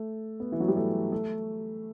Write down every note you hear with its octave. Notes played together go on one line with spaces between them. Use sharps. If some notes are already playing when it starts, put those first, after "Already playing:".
Already playing: A3
B3
E3
F#3
G3
A3
A3